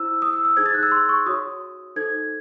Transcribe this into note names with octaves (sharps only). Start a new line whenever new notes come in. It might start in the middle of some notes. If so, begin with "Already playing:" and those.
Already playing: E4 C5 E6
D#6
E6
E6
D#4 G#4 C5 G#6
A6
F#6
E6
C6
C#6
F#4 C#5 D#6
D#4 A4 C5 G#6